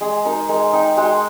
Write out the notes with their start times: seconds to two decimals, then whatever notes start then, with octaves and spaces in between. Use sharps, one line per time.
0.01 G#3 G#4
0.25 D#4 A#4
0.49 G#3 A#4
0.73 D#4 G5
0.97 G#3 G5